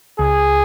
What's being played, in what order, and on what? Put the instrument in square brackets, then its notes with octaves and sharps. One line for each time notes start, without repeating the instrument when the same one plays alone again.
[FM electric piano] C#2 [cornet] G#4